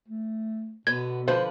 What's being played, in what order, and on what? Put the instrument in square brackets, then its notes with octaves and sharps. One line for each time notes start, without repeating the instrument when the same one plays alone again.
[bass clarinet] A3
[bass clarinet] B2 [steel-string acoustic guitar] D3 B3 [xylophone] G#6
[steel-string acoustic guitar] D3 F3 B4 [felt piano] C5